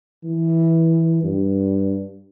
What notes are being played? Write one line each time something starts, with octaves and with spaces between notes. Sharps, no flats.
E3
G2